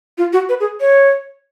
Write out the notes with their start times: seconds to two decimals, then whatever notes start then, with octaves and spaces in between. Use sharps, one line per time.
0.18 F4
0.33 F#4
0.49 B4
0.60 G#4
0.80 C#5